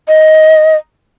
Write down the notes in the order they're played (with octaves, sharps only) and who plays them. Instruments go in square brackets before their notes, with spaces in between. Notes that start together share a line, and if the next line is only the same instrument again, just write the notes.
[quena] D#5